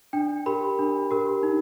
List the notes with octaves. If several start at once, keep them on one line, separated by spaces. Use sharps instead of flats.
D4 G5
G4 A#4 B5
D4
G4 A#4
D#4